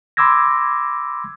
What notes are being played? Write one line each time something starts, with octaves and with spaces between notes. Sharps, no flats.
B5 C6 D6 E6 G#6 A#6